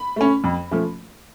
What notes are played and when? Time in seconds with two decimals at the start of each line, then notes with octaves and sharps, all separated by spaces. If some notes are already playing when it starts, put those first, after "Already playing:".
Already playing: B5
0.16 A3 C#4
0.44 F2
0.71 F3 A3 C#4